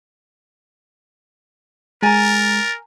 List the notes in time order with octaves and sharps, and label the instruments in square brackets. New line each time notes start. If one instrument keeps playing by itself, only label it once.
[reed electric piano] G#3 [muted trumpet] A#4 [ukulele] G#5 A#5 [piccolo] A6